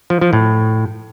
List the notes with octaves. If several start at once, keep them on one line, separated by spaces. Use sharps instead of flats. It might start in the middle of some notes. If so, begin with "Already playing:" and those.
F3
F3
A2